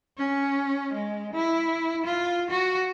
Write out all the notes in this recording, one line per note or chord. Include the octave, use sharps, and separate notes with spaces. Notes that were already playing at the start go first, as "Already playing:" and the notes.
C#4
G#3
E4
F4
F#4